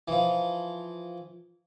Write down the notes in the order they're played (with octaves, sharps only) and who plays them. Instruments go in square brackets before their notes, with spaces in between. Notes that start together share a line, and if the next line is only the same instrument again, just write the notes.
[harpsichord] E3 F3